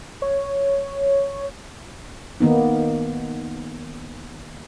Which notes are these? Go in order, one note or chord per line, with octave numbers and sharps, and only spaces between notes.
C#5
D#3 A#3 B3 D#4